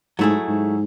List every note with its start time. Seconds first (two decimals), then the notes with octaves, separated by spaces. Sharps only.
0.19 G#2 F#3 A3 E4 G#4
0.48 G#2